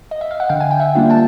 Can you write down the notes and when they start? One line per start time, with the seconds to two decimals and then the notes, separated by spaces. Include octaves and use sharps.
0.11 D#5
0.21 E5
0.31 F5
0.40 F#5
0.49 D3 F5 G5
0.60 G#5
0.71 G5
0.79 E5 F#5
0.95 G3 A#3 D4 F4
1.10 G5 A5